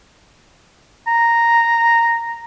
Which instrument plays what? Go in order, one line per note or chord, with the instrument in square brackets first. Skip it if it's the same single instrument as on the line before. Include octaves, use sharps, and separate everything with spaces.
[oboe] A#5